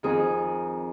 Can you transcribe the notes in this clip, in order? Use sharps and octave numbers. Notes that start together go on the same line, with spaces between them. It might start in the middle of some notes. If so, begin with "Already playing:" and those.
F2 D#3 G#4